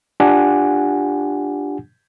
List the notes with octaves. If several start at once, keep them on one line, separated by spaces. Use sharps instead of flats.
D4 F4 G4 F#5 G#5